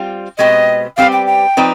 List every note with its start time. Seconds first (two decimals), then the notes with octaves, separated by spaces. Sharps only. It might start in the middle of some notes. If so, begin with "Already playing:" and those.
Already playing: G3 C4 F4
0.38 B2 G#3 C4 G4 B4 D#5
0.97 G3 C4 G4 B4 D5 F5
1.12 G5
1.27 G5
1.57 F3 C4 D#4 B4 D5